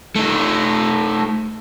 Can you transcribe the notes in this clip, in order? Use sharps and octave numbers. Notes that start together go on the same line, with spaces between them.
A3 D#4